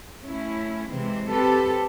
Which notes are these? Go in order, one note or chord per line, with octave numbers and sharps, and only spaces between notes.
A3 C#4 E4
C3 E3 G#3 C4
C4 G4 A4 B4